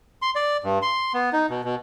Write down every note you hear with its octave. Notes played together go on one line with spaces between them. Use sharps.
C6
D5
G2
C6
B3
D#4
B2
B2